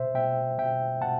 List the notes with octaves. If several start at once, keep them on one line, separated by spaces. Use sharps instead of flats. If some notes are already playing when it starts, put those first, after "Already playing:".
Already playing: B2 C5 E5
B2 E5 G5
B2 E5 G5
B2 F#5 A5